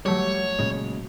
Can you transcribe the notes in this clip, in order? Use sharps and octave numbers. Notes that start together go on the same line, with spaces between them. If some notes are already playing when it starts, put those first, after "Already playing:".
F#3 G3 A3 F#4 C#5
A#2 C#3 G#3